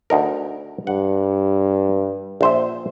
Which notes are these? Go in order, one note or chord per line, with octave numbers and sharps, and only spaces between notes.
D2 D#4 A#4
G2 F#5
A#1 C5 E5